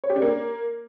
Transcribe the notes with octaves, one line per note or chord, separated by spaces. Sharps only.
C#5
G4
D4
A#3